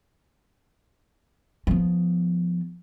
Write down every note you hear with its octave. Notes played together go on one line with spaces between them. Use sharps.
F3 B3